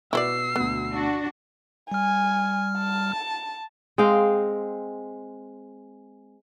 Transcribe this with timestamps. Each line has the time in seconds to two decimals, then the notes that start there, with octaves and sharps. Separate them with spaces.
0.13 B2 E4 F#4 B4 C5 D5 E6 C7
0.56 D2 B2 B3
0.94 D4 F#4
1.91 G3 G#5 F6
2.78 A5
3.98 G#3 C4 F5 G5